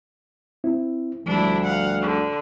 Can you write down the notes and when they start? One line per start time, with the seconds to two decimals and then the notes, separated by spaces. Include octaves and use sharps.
0.64 C4 E4
1.26 D2 F3 G3 A3 D4 E4
1.65 F5 F#5
2.02 D3